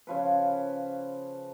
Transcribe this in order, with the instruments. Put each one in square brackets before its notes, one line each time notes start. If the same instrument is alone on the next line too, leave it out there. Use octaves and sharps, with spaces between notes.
[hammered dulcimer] C#3 F3 B4